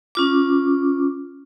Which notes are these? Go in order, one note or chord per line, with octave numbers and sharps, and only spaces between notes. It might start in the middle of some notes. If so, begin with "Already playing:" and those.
C#4 F4 D6